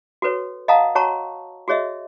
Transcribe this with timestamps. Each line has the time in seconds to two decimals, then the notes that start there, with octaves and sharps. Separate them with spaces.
0.22 F#4 A4 B4 C#5
0.68 D#5 F5 F#5 A5 A#5 D#6
0.95 F#4 C#5 F#5 A5 A#5 C#6
1.68 F#4 G#4 C#5 D#5 E5